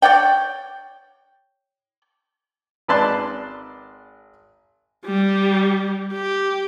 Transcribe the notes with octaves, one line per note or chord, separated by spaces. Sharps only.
C#5 D5 F#5 G5
G#1 B4 D5 A5 C6 F#6
G3
G4